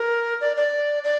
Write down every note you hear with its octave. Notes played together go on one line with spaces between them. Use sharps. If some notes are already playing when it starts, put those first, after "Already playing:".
Already playing: A#4
D5
D5
D5